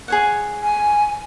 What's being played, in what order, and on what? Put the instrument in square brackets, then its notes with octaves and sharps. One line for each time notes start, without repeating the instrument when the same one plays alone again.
[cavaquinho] G#4 C#5 F#5
[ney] G#5